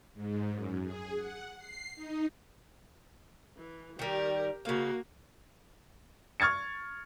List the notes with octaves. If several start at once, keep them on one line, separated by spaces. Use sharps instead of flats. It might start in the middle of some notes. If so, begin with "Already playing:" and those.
G#2
F#2
G#4
F#5
C7
D#4
E3
D#3 G3 G4 A#4
C#3 A#3 F#4 F5
C#6 F6 G#6 A6 C#7